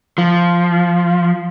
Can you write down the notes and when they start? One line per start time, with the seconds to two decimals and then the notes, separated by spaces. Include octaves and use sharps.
0.18 F3